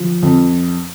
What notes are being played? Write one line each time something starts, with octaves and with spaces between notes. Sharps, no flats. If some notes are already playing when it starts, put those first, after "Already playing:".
Already playing: F3
F2